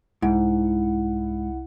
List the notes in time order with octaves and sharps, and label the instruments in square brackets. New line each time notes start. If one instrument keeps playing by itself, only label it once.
[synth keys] C2 E4 F#5 [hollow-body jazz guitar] G#2